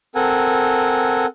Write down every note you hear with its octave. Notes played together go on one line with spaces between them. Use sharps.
C4 A4 A#4 F#5 G#5